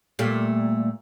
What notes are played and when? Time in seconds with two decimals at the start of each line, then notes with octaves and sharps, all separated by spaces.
0.19 A#2 G3 A3